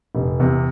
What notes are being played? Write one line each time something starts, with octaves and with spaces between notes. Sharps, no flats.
F1
E2 C3